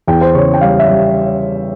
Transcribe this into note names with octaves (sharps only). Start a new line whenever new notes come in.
E2 G5
C5
C#3 C#5
G5
G3 F5
E5
G3